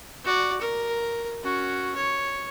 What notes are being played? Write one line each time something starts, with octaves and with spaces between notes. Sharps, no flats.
F#4 D5
A#4
C#4 F#4
C#5